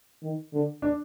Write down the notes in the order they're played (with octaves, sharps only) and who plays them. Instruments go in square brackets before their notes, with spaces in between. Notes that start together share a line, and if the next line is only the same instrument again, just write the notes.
[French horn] D#3
D3
[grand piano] D4